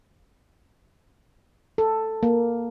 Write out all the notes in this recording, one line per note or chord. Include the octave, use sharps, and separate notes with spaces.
A4
A#3